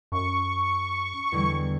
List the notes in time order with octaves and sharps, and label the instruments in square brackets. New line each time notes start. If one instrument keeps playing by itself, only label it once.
[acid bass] F#2 [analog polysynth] C#6
[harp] E2 D3 G3